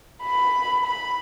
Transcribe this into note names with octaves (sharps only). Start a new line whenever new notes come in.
B5
B5